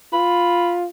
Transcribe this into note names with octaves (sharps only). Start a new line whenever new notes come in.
F4 B5